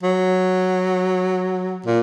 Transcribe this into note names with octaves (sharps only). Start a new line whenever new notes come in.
F#3
A#2